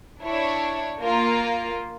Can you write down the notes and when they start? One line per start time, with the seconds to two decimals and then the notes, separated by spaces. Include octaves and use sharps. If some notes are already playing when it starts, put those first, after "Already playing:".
0.23 D4 E4 C#5
1.00 A#3 F4